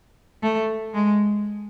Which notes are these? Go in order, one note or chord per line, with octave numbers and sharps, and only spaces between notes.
A3
G#3